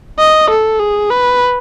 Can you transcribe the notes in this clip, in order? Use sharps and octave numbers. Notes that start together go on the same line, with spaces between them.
D#5
A4
G#4
B4